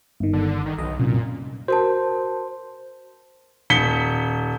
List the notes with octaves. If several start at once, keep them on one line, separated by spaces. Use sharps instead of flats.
G1 D#3
D3
D#3
B1 D#5
C2 F#2 A#2
F#4 A#4 C5 A5
D#1 B6 C#7 G7